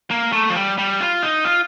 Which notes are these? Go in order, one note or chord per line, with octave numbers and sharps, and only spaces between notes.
A#3
A3
F3
G3
G3
F4
D#4
F4